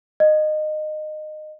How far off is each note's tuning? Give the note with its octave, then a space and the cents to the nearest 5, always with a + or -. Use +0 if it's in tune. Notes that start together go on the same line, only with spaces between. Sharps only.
D#5 -20